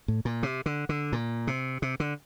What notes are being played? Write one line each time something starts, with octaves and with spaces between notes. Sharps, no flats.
A2
A#2
C3
D3
D3
A#2
C3
C3
D3